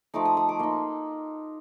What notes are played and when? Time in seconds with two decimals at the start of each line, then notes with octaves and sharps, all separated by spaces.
0.14 F3 A3 D#4 D6
0.25 D#6
0.37 D#6
0.49 D6
0.59 A#3 D#4 C6